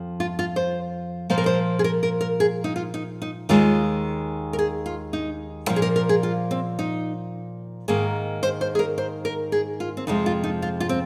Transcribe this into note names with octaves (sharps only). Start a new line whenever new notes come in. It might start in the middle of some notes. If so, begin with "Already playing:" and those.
Already playing: F2 F3
F4
F4
C5
A#2 F3 A#3 C5
A#4
C5
G#4
A#4
A#4
A#4
G#4
D#4
F4
D#4
D#4
D#2 D#3 G#3 F4
A#4
G#4
F4
D#4
A#2 F3 A#3 F4
G#4
A#4
A#4
G#4
F4
C4
D#4
G#2 D#3 A#3 G#4
C5
C5
G#4
A#4
C5
A#4
G#4
F4
C4
F2 C3 F3 G#3 D#4
F4
D#4
F4
F4
C4